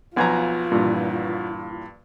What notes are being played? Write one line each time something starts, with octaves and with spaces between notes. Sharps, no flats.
B1 F2 B3 F4 G#5 A#5 G#6
G2 A#2 E3